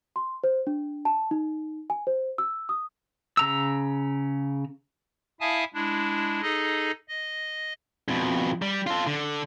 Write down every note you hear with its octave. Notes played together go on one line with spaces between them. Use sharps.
C6
C5
D4
A5
D#4
G#5
C5
E6
D#6
C#3 A#5 E6
E4 E5 F5 G#5 A5 D#6
G#3 D4 E4
D#4 G#4 A4 D#5
D#5
F2 B2
G3
F4 A4
D3